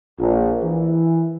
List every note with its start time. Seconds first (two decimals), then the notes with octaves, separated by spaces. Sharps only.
0.20 A#1
0.62 E3